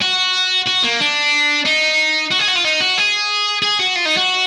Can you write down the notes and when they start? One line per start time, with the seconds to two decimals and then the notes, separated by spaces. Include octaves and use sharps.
0.02 F#4
0.67 F#4
0.84 A#3
1.01 D4
1.65 D#4
2.32 F#4
2.40 G#4
2.49 F#4
2.56 F4
2.65 D#4
2.81 F#4
2.98 G#4
3.63 G#4
3.80 F#4
3.96 F4
4.06 D#4
4.17 F#4